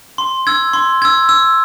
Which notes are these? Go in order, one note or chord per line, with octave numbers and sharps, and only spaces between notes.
C6
E6 G#6
C6
E6 G#6
E6